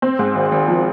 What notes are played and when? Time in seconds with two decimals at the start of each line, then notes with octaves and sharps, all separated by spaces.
0.02 C4
0.19 G#2
0.35 G#1
0.52 G#1
0.68 F3